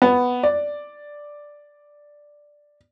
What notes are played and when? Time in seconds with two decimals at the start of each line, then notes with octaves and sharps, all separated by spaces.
0.02 B3
0.43 D5